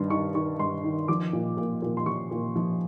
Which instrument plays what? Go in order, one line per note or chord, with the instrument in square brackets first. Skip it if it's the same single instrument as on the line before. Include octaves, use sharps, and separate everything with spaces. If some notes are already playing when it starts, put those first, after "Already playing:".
Already playing: [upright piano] G2 D#3 C6
D#3 C#6
D#3 C#6
G2 C6
D#3
F3 D6
A#2
A#2
A#2
C6
F3 C#6
A#2
F3